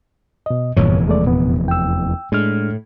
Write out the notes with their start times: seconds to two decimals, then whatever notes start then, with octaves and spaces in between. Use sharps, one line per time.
0.46 B2 D#5
0.77 F1 E2 G2 A#2 E3 C#5
1.08 G#3 A3 D5
1.24 A#2 B3
1.68 G5 E6
2.32 A2 G#3 D4 F6